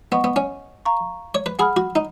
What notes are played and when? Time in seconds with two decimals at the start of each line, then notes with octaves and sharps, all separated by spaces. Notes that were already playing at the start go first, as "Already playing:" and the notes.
0.12 B3 D#5 F#5 C#6
0.24 B3
0.36 C#4
0.85 F5 A#5 C#6
1.35 C#5
1.46 B4
1.59 G#4 F#5 B5 F6
1.77 F#4
1.96 D#4